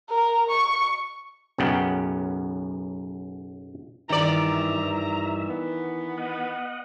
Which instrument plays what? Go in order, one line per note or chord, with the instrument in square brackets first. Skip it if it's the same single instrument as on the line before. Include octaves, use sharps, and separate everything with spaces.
[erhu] A#4
C#6
[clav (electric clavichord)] B1 F#2 C#3 B3 F#5 G5
[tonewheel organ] G2 E5 [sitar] D#3 D5 [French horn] E3 [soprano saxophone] A#5
[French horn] E3
[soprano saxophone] B3
[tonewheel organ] D#5 F#5